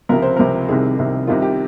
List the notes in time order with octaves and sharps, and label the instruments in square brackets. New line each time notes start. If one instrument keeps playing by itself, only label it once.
[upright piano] C#2 C3 F3 A#4
C5
C#2 C3 F3 A#4
C2 C3 D#3 G#4
C2 C3 D#3
C2 C3 D#3 F4
G4